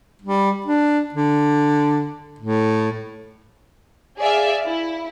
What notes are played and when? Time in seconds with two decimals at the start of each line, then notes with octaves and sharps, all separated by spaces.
0.22 G3
0.66 D4
1.14 D3
2.39 A2
4.18 G#4 D5 E5 F5
4.66 E4